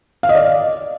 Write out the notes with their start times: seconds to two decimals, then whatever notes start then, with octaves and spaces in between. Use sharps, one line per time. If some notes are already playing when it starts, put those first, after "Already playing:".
0.23 F5
0.29 D#5
0.35 D5